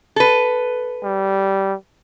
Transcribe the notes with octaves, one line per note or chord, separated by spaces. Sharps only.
A4 B4
G3